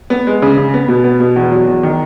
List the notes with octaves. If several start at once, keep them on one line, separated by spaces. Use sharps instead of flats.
B3
G#3
C#3
C#3
B3
B2
B3
B2
E2
F#3
E2
D#3